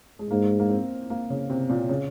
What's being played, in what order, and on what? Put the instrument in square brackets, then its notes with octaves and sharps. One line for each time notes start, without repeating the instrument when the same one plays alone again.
[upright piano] G#3
[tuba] G#2 [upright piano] A#3
[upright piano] A#3
C4
A#3
C#3
C3
A#2
C#3